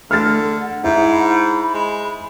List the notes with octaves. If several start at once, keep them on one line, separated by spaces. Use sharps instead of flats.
D3 A3 F6 A6
A4
F#5
G#2 E4
B5
G#3